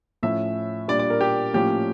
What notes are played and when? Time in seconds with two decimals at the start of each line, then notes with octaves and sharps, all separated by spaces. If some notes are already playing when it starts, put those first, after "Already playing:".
0.23 A2 F3 C#4 E5
0.88 A#2 G3 D4 D5
0.99 D5
1.10 A#4
1.21 G4
1.54 A2 F3 A#3 C#4 G4